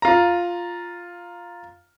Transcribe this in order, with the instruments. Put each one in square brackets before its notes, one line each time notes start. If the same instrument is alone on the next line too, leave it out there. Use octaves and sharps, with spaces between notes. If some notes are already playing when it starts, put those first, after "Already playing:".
[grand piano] F4 A#5